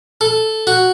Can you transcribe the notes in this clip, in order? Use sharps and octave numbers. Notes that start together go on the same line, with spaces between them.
A4
F#4